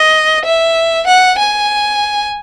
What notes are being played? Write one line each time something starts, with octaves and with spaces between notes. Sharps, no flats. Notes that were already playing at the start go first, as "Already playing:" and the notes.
Already playing: D#5
E5
F#5
G#5